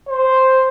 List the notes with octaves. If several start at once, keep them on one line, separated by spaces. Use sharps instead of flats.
C5